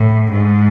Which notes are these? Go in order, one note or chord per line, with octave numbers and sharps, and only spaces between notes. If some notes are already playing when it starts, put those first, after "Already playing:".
Already playing: A2
G#2